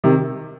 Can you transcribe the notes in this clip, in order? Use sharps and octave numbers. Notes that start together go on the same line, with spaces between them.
C3 D#3